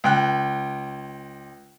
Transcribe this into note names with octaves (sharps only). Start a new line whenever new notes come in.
C#2 G5 F#6